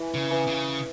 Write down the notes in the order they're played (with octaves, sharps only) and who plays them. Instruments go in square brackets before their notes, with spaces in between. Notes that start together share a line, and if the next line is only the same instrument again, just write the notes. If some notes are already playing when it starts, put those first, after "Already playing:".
Already playing: [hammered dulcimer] E3
[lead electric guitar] C#3
[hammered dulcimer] E3
[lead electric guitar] C#3